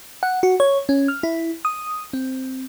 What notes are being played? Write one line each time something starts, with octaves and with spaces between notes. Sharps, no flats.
F#5
F#4
C#5
C#4
F6
E4
D#6
C4